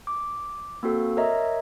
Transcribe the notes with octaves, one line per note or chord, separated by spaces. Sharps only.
D6
A#3 C4 F#4 A4
A#4 C#5 D#5 E5 A#5